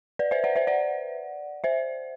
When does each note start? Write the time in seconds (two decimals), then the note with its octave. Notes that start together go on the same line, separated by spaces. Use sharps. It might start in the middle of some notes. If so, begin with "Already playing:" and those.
0.19 B4 D5
0.31 C5 E5
0.44 D5 F#5
0.56 C5 E5
0.67 D5 F#5
1.64 C5 E5